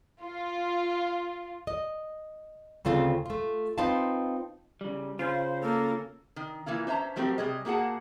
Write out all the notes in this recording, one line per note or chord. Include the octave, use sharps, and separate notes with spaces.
F4
D#5
D2 C#3 C4 F4 A4
A3 F4
C4 D#4 F4 B4 F5 A5
C#3 G3
C#3 C#4 F4 C5
A#3 A4
D#3
E3 A#3 E4 F4
C#4 C5 E5 A#5
F3 F#3 A3 C4 G4 A#4
C3 G3 G#4 D#5
A#2 A#3 F#4 G#4 F#5 A5